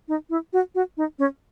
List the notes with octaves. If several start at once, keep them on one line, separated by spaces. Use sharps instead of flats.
D#4
E4
F#4
F#4
D#4
C#4